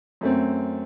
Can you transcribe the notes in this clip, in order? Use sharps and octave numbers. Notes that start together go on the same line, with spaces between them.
F#2 A3 C4